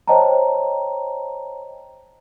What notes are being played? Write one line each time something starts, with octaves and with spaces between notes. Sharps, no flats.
C5 C#5 D#5 G5 A5 A#5